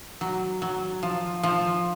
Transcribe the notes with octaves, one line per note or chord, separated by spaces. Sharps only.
F#3
F#3
F3
F3